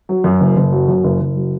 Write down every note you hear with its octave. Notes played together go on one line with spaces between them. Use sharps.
F#3
F#2
F#1
F#1
F#3
F#2
F#1
F#1
F#3